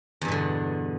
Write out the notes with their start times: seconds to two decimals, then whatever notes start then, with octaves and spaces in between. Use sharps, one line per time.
0.21 E2
0.25 G2
0.28 B2
0.32 D3